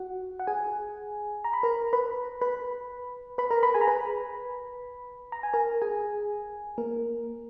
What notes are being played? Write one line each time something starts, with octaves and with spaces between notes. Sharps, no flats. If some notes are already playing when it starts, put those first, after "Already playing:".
Already playing: F#4 F#5
F#5
G#4 G#5
A#5
B5
A#4 A#5
B4 B5
B4 B5
B4 B5
A#4 A#5
B4 B5
G#4 G#5
A#5
B4 B5
A#5
G#5
A#4 A#5
G#4 G#5
A#3 A#4